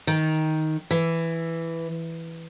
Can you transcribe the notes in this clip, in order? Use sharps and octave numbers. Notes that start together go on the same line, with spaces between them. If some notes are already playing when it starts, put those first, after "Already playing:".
D#3
E3